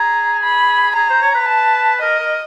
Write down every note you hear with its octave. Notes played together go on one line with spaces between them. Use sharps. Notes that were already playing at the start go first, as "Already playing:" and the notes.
Already playing: G#4 A#5
B5
G#4 A#5
C5
C#5
B4
A5
A#4 D#5
A#4